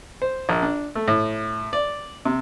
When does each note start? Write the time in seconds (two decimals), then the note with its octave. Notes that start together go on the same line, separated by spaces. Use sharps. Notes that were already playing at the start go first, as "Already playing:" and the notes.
0.22 C5
0.49 A#1
0.62 D4
0.95 A3
1.08 A2
1.73 D5
2.25 C3